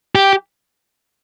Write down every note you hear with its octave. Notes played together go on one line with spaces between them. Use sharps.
G4